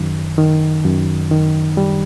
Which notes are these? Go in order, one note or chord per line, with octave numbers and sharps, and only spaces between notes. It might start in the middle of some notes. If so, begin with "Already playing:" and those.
Already playing: F#2 D#3
D#3
F#2
D#3
G3